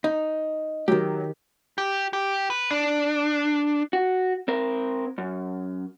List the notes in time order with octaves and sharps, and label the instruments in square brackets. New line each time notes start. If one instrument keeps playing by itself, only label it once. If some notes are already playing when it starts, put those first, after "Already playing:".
[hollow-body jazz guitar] D#4
[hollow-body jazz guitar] D#3 G4 [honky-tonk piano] F#3
[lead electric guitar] G4
G4
B4
D4
[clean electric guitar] F#4
C4 A#4
F#2